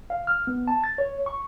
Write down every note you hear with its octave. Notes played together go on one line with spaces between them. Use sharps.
F5
F6
B3
A5
A6
C#5
C#6